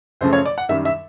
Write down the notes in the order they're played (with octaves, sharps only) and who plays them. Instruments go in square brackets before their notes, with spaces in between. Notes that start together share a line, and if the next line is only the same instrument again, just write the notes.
[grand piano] F#2 C#3 F3 A3 C5
C#5
D5
F#5
F#2 D#3 G3 E5
E5